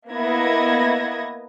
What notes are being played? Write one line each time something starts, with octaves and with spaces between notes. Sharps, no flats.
A#3 B3 E4 D#5 G#6 A#6